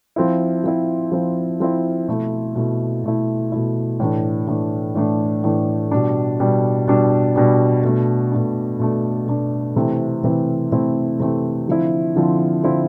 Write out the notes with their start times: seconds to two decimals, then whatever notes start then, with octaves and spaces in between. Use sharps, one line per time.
0.16 F3 C4 E4
0.64 F3 C4 E4
1.12 F3 C4 E4
1.60 F3 C4 E4
2.08 B2 A3 E4
2.55 B2 A3 E4
3.04 B2 A3 E4
3.52 B2 A3 E4
4.00 A2 E3 A3 D4
4.48 A2 E3 A3 D4
4.95 A2 E3 A3 D4
5.44 A2 E3 A3 D4
5.91 B2 G3 D4
6.40 B2 G3 D4
6.88 B2 G3 D4
7.36 B2 G3 D4
7.84 B2 A3 D4
8.32 B2 A3 D4
8.80 B2 A3 D4
9.28 B2 A3 D4
9.76 C3 E3 A3 C4 E4
10.24 C3 E3 A3 C4 E4
10.72 C3 E3 A3 C4 E4
11.20 C3 E3 A3 C4 E4
11.68 D3 F3 C4 E4
12.16 D3 F3 C4 E4
12.64 D3 F3 C4 E4